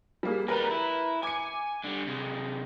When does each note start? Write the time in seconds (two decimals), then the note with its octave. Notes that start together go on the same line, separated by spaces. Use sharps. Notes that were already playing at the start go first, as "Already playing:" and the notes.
0.23 G3 A#3 G#4
0.48 F2 G3 A#4 B4 A#5
0.71 E4
1.23 G#5 D6 C#7
1.84 D3 G3
2.07 C3 G#3